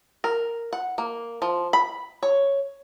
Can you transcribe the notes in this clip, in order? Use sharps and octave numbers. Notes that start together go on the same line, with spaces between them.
A#4
F#5
A#3
F3
B5
C#5